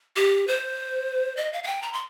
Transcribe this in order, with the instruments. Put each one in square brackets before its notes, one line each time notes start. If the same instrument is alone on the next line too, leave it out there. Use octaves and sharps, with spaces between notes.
[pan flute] G4
C5
D#5
F5
F5
G5
A#5
C6